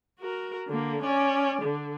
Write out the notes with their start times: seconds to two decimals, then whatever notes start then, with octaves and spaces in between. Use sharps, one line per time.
0.19 F#4 A#4
0.68 D3 A#3
1.02 C#4 D5
1.62 D3